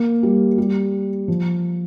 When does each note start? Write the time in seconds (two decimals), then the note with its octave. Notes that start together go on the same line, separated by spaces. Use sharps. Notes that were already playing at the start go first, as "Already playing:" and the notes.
Already playing: A#3
0.23 G3
0.58 G3
1.28 F3